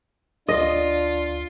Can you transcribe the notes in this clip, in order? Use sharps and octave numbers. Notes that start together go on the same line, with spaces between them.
D2 D4 F4 D#5